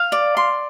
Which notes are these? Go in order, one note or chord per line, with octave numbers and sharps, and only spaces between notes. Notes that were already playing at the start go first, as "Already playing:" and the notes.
Already playing: F5
D5
C6